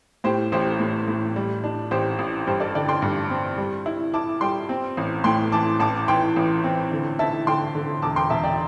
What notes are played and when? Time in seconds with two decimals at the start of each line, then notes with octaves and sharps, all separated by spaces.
0.24 A2 G4 C5
0.52 A1 G4 C5
0.80 A2
1.08 A2
1.36 G3
1.64 D4
1.91 A1 G4 C5
2.19 A1
2.47 G2 G4 C5
2.60 A4 D5
2.75 D3 D5 G5
2.88 G5 C6
3.02 G2
3.30 C4
3.58 G3
3.86 E4
4.14 E4 A5 D6
4.41 G3 G5 C6
4.69 C4
4.97 A1
5.24 A2 G5 C6
5.52 E3 A5 D6
5.80 A1 A5 D6
6.08 E3 G5 C6
6.36 A1
6.64 C4
6.91 D3
7.19 E4 E5 A5
7.47 D3 G5 C6
7.75 D3
8.02 E1 A5 D6
8.16 G5 C6
8.30 E1 E5 A5
8.44 D5 G5